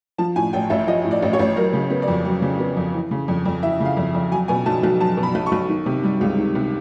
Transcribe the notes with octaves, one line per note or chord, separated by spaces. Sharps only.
F3 A5
A2 G#5
A1 G5
A1 E5
F3 D#5
A2
D5
A1
C#5
A1
F#3 A#4
C#3
B3
D5
F2
F#3
C#3
B3
F2
E3
C#3
F2
F2
E3 E5
C#3 F5
F2
F2
F#3 G#5
B2 G#5
B1 A5
B1
F#3 A5
B2
B5
B1
C#6
B1
D#3
C3
G3
C#2
D#3
C3